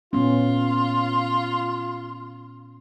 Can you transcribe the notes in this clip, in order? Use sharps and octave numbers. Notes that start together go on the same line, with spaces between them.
A#2 B3 C#4 F4